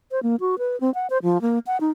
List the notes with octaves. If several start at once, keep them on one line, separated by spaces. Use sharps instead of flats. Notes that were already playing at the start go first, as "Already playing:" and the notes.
C5
A#3
F#4
B4
C4
F#5
C5
F3
A#3
F#5
D#4